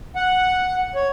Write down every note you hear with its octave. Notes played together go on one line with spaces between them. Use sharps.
F#5
C#5